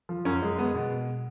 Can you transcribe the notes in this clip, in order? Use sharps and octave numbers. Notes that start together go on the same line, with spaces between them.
F3
F#2 C#4
G#3
G#3 B3
B2